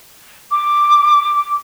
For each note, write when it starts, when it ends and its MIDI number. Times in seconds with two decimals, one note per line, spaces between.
0.52 1.56 86